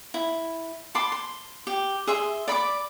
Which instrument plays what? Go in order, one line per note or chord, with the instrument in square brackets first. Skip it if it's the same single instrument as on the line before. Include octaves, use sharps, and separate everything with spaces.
[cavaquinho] E4
A5 B5 C6 D6
C6
G4
G#4 E5 C6
D5 B5 C#6 D6